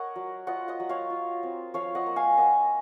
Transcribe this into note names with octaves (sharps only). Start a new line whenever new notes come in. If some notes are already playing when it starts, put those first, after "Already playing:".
Already playing: A#4 C#5 D#5 F#5
F#3
F4 D#5 F#5
D#5 F#5
F#3
C#5 F5
F4
C4
F3 C#5 F5
D#5 F#5
A#3
F5 G#5
A#3 D#5 F#5